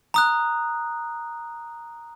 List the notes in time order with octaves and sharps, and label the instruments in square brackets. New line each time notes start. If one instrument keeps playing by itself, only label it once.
[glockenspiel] A#5 D#6 F#6